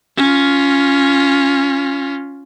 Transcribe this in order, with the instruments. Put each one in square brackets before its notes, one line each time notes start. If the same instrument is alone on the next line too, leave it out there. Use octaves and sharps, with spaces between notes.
[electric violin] C#4 F4